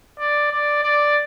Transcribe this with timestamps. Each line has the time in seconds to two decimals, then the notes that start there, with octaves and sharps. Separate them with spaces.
0.19 D5
0.51 D5
0.83 D5